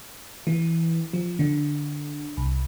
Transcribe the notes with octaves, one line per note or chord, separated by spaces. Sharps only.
E3
F3
D3
C2